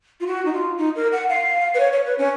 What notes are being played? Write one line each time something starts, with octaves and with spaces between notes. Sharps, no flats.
F4
F#4
D#4
F4
D#4
A#4
F#5
F5
B4
C#5
C#5
B4
C#4